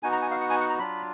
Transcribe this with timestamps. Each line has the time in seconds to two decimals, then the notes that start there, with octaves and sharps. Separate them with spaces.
0.03 B3 D#4 F#4 G#5
0.12 A#5
0.22 G#5
0.31 F5
0.41 F#5
0.50 G#5
0.60 F#5
0.70 A#5
0.79 F#3 D4 F4 B5